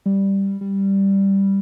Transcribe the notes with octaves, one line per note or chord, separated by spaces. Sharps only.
G3
G3